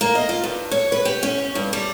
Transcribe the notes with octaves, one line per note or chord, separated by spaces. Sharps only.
A#3
D#5
F4
G2
C#5
B4
G4
C#4
G2
G3